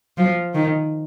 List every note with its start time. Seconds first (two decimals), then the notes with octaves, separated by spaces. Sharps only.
0.18 F3
0.54 D#3